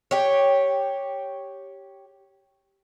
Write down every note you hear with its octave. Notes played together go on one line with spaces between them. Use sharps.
G4 C#5